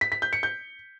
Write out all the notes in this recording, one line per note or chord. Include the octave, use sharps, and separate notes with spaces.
B6
B6
G6
C#7
G6